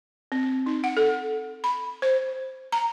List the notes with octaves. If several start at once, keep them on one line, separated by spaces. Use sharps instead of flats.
C4
D#4
F#5
A4
B5
C5
A#5